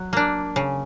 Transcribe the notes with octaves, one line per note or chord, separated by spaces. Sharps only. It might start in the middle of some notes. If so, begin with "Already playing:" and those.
Already playing: F#3
A#3 D4
C#3